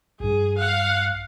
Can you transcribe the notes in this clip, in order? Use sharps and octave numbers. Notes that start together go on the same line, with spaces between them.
A#1 G2 G#4
F5 F#5